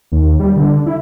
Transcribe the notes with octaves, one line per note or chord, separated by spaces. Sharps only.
D#2
G3
D3
E4